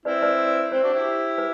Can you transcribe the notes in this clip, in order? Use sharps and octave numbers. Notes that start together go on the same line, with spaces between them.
C4 E4 B4 D5
B4 D5
C4 E4 C5
D4 F#4
E4 G4
B4